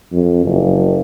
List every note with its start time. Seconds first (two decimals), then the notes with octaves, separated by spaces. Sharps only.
0.12 F2
0.45 F#1